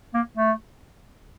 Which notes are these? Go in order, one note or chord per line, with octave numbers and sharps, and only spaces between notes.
A#3
A3